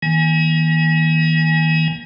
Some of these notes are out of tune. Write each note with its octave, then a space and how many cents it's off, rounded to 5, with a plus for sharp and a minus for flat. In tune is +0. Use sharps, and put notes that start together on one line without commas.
D#3 +45 A#3 +35 G#5 +0